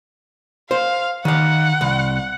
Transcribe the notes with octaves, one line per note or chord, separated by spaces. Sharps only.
C5 F5
D#3 F5 F#5
C2